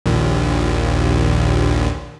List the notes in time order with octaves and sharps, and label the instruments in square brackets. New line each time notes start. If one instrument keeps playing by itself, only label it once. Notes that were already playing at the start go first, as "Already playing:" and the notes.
[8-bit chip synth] A#1 D#2